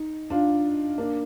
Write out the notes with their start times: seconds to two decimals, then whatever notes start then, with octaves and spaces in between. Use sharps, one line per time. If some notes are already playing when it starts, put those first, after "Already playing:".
Already playing: D#4
0.30 D4 F4
0.98 A#3 D4